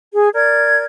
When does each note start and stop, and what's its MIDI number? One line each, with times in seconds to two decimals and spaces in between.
0.13 0.28 68
0.34 0.85 70
0.34 0.85 74
0.34 0.85 92